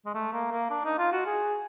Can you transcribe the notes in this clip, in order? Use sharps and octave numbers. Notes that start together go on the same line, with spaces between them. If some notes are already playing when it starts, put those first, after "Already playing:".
G#3
A3
A#3
A#3
D4
D#4
F4
F#4
G#4